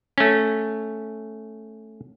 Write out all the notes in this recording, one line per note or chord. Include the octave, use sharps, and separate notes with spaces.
A3 C#4